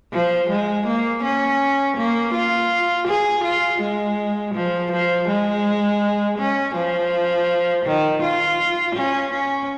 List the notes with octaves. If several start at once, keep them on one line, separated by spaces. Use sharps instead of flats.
F3
G#3
A#3
C#4
A#3
F4
G#4
F4
G#3
F3
F3
G#3
C#4
F3
D#3
F4
C#4
C#4